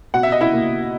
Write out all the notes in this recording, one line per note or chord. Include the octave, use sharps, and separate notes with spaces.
B2 F#5
E5
D#5
E4 E5
A#3